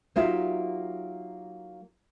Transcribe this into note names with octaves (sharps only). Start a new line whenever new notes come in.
F#3 A#3 D#4 F4 G4 E5